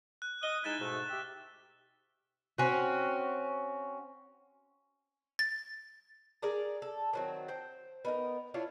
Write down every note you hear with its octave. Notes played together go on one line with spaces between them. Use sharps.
F#6
D#5 D#6 F6 G7
G#3 D#4 E4 F#6 A6 E7
G#2 B2 A3
G4 E5
C4 C#4 F#4
A6
G#4 A#4 D5 A#5
A4
D#3 F#3 C4
C5 G5
B3 D#4 A#4
D4 E4 F4 C#5